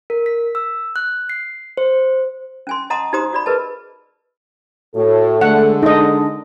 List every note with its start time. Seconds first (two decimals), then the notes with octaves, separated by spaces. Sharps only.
0.10 A#4
0.26 B6
0.55 E6
0.96 F#6
1.29 C7
1.77 C5
2.67 C#4 G#5 C6
2.90 D#5 F#5 A5 A#5 C6 D#6
3.13 D#4 F#4 G4 C5 A#5 D#6
3.33 F#4 D5 B5
3.46 G#4 A#4 B4 D#5 A5
4.95 A2 F#4 A4
5.41 D3 G#3 A3 F#5
5.83 D4 D#4 D#5